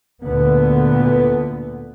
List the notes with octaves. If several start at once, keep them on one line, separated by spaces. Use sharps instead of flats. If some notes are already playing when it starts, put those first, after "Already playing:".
D2 A#2 D3 B3